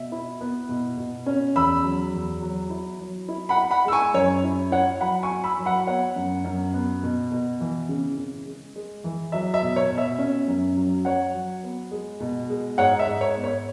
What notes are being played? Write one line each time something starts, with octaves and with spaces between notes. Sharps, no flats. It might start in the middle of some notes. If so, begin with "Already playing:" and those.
Already playing: B2 E5
E4
B3
B2
B2
C#4
E2 B5 E6
F#3
E2
F#3
E4
F#3
E4
F#5 B5
E4
F#5 B5
G#3 E6
G#5 C#6
F#2 C#5
E4
E4 C#5 F#5
F#3 F#5 B5
G#5 C#6
E4
B5 E6
F#3
F#5 B5
B3 C#5 F#5
F#2
F#2
B3
B2
B2
E3
C#3
C#3
G#3
G#3
E3
F#3 E5
E5
B2
C#5
B2
E5
C#4
F#2
F#3
F#3 C#5 F#5
F#3
B3
G#3
B2
G#3
G#2 C#5 F#5
E5
G#2
C#5
B3
C#5